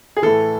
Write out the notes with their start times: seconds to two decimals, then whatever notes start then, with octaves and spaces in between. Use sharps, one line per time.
0.17 G#4
0.22 A2 E3 A4